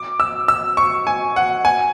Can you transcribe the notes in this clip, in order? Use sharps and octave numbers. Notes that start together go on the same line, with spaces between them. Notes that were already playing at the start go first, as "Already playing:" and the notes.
Already playing: D6
E6
E6
C#6
G#5
F#5
G#5